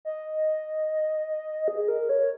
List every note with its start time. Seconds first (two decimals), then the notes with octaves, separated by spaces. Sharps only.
0.05 D#5
1.68 G#4
1.88 A#4
2.09 C#5